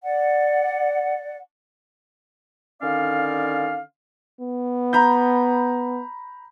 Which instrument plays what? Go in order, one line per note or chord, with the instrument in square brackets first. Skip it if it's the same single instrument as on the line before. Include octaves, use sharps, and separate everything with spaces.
[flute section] D5 F#5
[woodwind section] D3 D#3 C#4 D5 F5
[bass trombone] B3
[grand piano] A#5 B5 G6